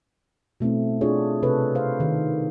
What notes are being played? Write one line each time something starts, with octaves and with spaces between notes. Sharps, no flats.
B2 A3 C4 E4
D4 F4 G#4 C#5
C3 A4 B4 C#5
C5 F5
D#3